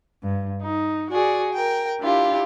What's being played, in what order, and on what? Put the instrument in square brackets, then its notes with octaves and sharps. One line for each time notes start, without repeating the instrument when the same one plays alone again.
[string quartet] G2
D#4
F#4 G#4 D5
A#4 G5
D4 E4 F4 G4